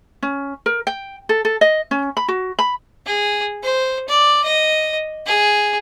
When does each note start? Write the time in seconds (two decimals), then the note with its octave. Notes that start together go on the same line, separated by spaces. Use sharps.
0.23 C#4
0.66 A#4
0.87 G5
1.29 A4
1.45 A4
1.61 D#5
1.91 C#4
2.17 B5
2.28 F#4
2.59 B5
3.06 G#4
3.64 C5
4.09 D5
4.44 D#5
5.27 G#4